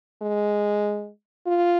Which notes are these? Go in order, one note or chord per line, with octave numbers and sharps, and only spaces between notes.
G#3
F4